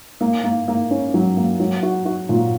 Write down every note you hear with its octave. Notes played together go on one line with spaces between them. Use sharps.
A#3
A#3
A#3
C#4
F#3
A#3
F#3
F#4
F#4
A#2